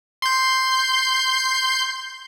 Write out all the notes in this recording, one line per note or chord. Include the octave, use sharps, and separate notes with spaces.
C6 G6